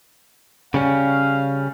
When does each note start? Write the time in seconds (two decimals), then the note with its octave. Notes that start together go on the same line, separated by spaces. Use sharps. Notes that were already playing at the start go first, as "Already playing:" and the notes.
0.74 C#3 G3 C#4 F5